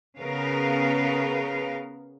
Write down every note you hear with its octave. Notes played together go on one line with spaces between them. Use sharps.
C#3 B3 A#4 B4 F5